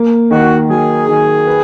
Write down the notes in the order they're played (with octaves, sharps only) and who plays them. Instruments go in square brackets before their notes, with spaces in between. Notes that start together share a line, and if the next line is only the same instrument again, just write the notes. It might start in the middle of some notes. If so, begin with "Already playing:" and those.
Already playing: [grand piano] A#3
[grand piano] D#3 [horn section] F#4
[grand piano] F#3 [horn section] G#4
[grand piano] D#3
B4